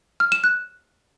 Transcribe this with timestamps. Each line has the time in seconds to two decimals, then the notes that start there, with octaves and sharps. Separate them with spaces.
0.20 F6
0.32 E7
0.44 F#6